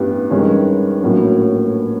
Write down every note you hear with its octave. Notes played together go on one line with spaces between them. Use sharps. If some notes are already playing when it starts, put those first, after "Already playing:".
Already playing: A1 G2 E3 G3 B3
G2 D#3 G#3 C#4
A#1 A2 F#3 A#3 C#4